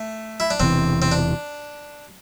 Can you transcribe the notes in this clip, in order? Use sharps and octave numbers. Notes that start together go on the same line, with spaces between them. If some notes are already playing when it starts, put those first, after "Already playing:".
Already playing: A3
E4
D4
E1 E2 C3 E3 C4
C4
D4